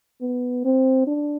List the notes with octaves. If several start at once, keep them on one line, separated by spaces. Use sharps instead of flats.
B3
C4
D4